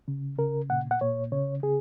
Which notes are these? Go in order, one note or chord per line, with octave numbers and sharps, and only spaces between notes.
C#3
C#3 A#4
A#2 F#5
F#5
A#2 C#5
C#3 C#5
C#3 G#4